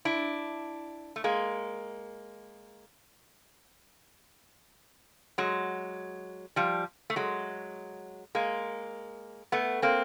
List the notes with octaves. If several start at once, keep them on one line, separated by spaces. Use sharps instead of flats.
D4 E4
A3
G#3 A#3
F#3 G#3
F3 G3
A3
F#3 G#3
G#3 A#3
A3 B3
A#3 C4